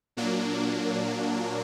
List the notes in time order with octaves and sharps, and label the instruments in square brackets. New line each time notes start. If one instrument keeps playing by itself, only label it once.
[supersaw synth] A#2 F#3 A#3 D4